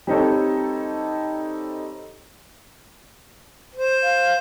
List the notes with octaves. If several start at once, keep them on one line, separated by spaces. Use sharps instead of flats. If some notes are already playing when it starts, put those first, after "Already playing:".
G3 C4 D#4 A4 C#5
C5
F5